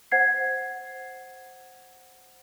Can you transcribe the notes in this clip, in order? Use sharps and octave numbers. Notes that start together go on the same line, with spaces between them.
C5 F#5 G#6 C7